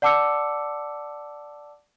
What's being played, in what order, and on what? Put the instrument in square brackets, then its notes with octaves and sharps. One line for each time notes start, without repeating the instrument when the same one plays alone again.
[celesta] D5 F#5 A5 D6 E6 C#7